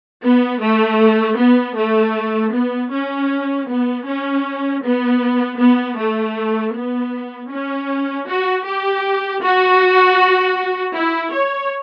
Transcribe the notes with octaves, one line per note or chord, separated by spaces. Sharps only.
B3
A3
B3
A3
B3
C#4
B3
C#4
B3
B3
A3
B3
C#4
F#4
G4
F#4
E4
C#5